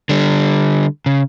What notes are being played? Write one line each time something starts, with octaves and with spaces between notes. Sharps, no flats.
D3 G3
C#3